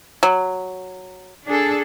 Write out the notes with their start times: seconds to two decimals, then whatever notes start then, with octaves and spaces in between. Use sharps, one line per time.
0.23 F#3
1.46 D4 G#4 A4